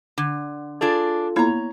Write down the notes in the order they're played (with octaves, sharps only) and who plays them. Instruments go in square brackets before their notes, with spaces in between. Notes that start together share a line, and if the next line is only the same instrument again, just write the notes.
[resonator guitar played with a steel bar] D3
[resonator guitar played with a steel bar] D4 G#4 D5 [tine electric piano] F4 A4
[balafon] A#3 B3 E4 [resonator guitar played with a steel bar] C#5 A#5